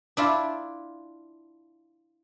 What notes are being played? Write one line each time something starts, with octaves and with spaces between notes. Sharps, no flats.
D4 E4 F4